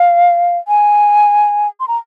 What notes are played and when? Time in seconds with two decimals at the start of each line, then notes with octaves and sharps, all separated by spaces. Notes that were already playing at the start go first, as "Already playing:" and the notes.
Already playing: F5
0.68 G#5
1.80 C6
1.88 A#5